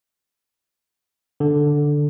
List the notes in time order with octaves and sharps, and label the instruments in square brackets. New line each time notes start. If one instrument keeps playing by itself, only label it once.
[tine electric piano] D3